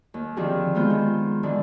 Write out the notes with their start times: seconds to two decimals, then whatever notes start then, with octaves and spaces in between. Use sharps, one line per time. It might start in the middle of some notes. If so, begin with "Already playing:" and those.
0.14 D#2
0.37 D3 D#3 F3 C4 G4 G#4
0.75 G#3 B3 F4 C5 G6
0.90 D#3
1.43 G#2 D3 F3 G#3